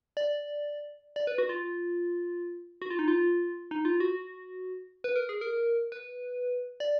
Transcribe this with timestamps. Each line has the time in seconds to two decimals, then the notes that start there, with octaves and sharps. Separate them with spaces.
0.17 D5
1.16 D5
1.27 B4
1.38 F#4
1.49 F4
2.82 F#4
2.90 F4
2.99 D#4
3.08 F4
3.71 D#4
3.85 F4
4.00 F#4
5.04 B4
5.16 A#4
5.29 G#4
5.41 A#4
5.92 B4
6.80 D5